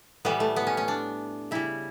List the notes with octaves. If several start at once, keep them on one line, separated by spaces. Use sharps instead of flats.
A2 E3 G3 B3
A3
B3
C#4
C#4
D4
C#3 G3 E4